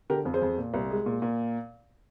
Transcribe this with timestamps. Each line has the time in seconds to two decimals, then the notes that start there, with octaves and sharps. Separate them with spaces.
0.10 D3 G4 A#4
0.25 F2
0.34 G#4 C5
0.42 F2
0.58 A#2
0.74 C2
0.90 G#3
1.06 A#2
1.22 A#2